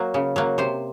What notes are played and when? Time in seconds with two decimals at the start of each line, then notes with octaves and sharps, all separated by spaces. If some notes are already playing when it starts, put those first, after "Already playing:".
Already playing: F#3 A#3
0.14 C#3
0.36 F#3 A#3
0.58 C3 C5